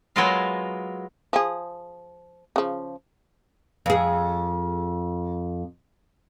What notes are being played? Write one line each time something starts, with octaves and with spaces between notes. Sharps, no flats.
F#3 G#3 B3 F4 A#4 F5
F3 G#4
C#3 F3
F2 G#4